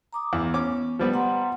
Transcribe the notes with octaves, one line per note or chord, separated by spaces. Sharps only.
A#5 D6 D#6
E2 B3
C#4 D6
F3 G3 B3
F#5 A#5 C6